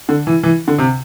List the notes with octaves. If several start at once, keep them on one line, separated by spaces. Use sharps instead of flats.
D3
E3
E3
D3
C3